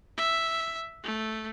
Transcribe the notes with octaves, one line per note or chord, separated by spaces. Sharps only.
E5
A3